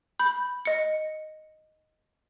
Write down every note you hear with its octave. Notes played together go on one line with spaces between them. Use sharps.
B5 G6
D#5 C#7